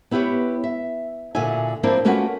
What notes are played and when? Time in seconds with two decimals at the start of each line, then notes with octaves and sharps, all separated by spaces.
0.11 B3 E4 G4 A4 B4 C#5
0.64 E5
1.35 A#2 D3 E4 F#4 E5 G#5
1.83 F3 A#3 C4 D4 E4 A#4
2.05 A3 A#3 C#4 F4 F#4 B4